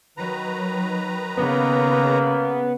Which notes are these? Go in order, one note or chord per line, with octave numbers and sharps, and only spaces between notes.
D#3 F#3 B4 A#5
C#3 A#3 B3